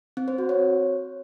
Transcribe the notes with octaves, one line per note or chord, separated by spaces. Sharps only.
C4
C5
F#4
C#5